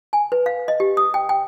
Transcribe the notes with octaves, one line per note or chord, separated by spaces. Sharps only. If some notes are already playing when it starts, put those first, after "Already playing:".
G#5
B4
F5
D#5
G4
D#6
G5
G5